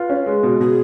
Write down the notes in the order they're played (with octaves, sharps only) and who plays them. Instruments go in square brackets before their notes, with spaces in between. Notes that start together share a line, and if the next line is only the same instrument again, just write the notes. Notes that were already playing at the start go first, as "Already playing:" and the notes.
Already playing: [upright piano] F4 [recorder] B4
[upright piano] C#4
G#3
B2
[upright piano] B2 [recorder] G#4